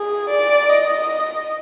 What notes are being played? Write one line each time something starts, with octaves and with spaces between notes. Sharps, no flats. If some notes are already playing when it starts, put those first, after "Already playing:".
Already playing: G#4
D5
D#5